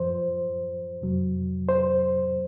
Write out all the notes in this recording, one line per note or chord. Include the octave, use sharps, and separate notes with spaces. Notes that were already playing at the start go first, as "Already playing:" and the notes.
Already playing: F#2 F3 C5
F2 C3 F#3
C5